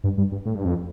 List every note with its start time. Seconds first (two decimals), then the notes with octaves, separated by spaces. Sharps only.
0.04 G2
0.18 G2
0.32 G2
0.46 A2
0.55 G2
0.65 F2